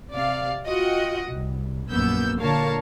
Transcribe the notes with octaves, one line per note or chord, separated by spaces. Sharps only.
C3 D5 F5
F4 F#4 D#5 F#5 G5
C2
A#1 F#2 A#3 B3 E6 G6
A#2 D3 A#4 C#5 F5 A5